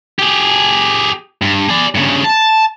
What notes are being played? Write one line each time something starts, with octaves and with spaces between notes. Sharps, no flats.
G4 G#4
G2
G#4 D5
G2 C#3
A5